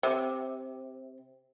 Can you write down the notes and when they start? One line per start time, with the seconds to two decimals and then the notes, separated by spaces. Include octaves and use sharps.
0.03 C3